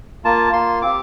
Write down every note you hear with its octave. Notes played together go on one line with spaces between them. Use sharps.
A#3 F4 A5
A#3 F4 C6
C4 G4 D6